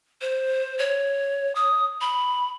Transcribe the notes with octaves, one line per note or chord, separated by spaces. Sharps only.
C5
C#5
D#6
B5